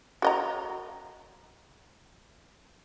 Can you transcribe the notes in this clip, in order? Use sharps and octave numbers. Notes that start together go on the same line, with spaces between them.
F#4 D#5 A#5